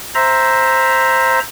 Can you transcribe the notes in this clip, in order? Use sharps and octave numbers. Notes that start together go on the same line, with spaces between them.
C5 E5 A#5